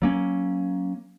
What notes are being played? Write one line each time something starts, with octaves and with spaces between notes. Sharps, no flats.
F#3 A#3 C#4